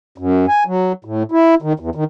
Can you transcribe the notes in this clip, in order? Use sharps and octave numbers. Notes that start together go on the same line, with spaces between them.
F#2
G#5
F#3
A2
E4
D#3
E2
D#3